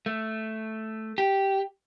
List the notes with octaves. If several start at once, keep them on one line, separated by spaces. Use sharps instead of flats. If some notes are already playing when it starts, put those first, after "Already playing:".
A3
G4